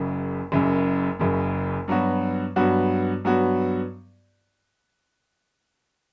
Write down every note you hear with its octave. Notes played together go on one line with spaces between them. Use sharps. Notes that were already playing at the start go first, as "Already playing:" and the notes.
Already playing: F#1 F#2 C#3
F#1 F#2 C#3
F#1 F#2 C#3
G2 F#3 B3 F#4
G2 F#3 B3 F#4
G2 F#3 B3 F#4